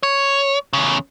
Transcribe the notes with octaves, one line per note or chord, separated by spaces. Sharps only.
C#5
E2 C#3